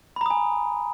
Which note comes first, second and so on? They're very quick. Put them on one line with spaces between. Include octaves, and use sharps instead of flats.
B5 A#5 D#6 G#5